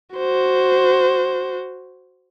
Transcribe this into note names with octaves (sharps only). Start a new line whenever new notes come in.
F#4 C5